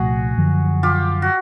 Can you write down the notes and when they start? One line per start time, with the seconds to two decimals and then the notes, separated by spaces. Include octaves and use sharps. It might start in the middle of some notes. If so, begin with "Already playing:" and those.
Already playing: C2 A#2 F3 A3 F#4 G#4
0.38 F#2 D3 F3
0.83 F4 G4
1.22 F#4